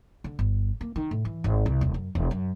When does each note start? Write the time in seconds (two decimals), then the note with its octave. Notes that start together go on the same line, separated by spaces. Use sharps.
0.24 D3
0.39 G1
0.81 A#3
0.96 D#3
1.11 A2
1.25 E3
1.44 G#1
1.66 C2
1.81 D#1
1.94 F#2
2.15 E1
2.31 F#2